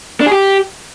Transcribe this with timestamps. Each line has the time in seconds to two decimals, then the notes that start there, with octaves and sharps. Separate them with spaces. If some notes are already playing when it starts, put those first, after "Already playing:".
0.20 D4
0.26 G#4
0.32 G4